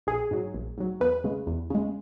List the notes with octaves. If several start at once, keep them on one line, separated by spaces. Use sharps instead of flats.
A#1 G#4
G#2 F#3
A#1
G#2 F#3
E2 B4
C#3 G#3
E2
C#3 G#3